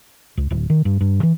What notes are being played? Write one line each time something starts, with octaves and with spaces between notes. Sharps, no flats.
C#2
D1
D#3
G2
G2
E3